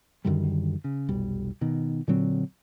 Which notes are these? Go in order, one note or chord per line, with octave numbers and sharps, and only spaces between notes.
F#2 D3 D#3 G3
C#3
F1 B1 G3
B2 D#3
A#2 D3 F#3 C4